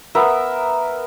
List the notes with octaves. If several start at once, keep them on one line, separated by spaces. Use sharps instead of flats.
B3 A#4 E5